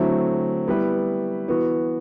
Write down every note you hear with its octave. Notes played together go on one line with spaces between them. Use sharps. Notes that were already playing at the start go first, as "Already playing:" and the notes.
Already playing: D3 F#3 A3 C4 E4
G3 B3 E4 B4
E3 B3 F#4